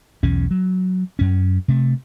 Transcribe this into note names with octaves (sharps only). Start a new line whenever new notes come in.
B1 E2 C#4
F#3
F#2 C#4
C3 A3